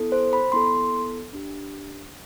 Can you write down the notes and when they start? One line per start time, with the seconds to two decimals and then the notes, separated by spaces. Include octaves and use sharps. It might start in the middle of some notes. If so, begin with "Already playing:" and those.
Already playing: B3 E4 A4
0.12 C5
0.33 B5
0.52 B3 E4 A4 C6
1.33 D4 G4